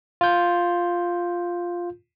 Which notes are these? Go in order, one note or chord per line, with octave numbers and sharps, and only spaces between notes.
F4 G6